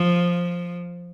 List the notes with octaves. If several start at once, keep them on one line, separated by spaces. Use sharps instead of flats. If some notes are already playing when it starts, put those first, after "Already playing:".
Already playing: F3